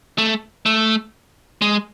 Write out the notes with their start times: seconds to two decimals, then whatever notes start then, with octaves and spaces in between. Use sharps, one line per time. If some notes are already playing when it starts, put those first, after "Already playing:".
0.18 A3
0.66 A3
1.62 G#3